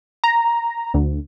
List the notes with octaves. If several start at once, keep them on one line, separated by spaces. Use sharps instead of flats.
A#5
D2